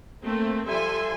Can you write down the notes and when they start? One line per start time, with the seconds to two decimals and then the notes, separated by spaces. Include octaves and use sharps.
0.24 A3 A#3 C4
0.66 F3 G3 A4 E5 G#5 C6